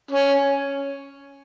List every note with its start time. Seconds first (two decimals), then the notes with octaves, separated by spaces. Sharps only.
0.11 C#4